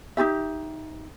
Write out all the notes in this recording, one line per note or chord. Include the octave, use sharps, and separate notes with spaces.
D#4 F4 G4 E5